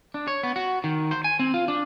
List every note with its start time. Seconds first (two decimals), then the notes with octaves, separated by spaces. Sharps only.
0.14 D4
0.28 C#5
0.43 B3
0.56 F#4
0.84 D#3
1.11 C5
1.24 G#5
1.39 C4
1.54 F4
1.68 D4